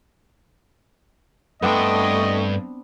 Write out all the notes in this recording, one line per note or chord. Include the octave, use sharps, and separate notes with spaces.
G2 A3 B3 C4 D4 D#5 G5